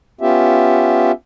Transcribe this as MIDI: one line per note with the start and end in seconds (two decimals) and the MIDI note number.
0.21 1.12 59
0.21 1.12 61
0.21 1.12 65
0.21 1.12 67
0.21 1.12 76